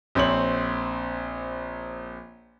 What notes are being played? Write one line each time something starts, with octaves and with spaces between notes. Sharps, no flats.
A#1 C4 C#5 F#7